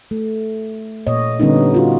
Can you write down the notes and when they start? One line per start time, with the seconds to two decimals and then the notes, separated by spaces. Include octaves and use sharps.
0.11 A3
1.07 A#2 C#5 D#5
1.40 D3 G3 B3 C#4 D#4
1.74 F4 F#4